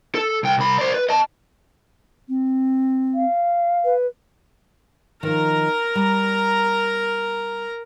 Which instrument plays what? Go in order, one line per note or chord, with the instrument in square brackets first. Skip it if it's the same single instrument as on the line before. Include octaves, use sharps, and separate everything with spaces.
[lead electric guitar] A4
C2 G5
C2 B5
C5 D5
B4
D#5 A5
[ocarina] C4
[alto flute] F5
[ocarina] B4
[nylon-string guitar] D#3 F3 [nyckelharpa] A#4 A#5
[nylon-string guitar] G3